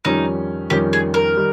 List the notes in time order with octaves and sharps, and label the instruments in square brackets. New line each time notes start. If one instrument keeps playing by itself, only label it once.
[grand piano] F2 D#3 G3 C#4 [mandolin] D#4
[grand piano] F2 D#3 G3 C#4 [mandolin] G4
[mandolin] G#4
A#4
[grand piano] D#3 G3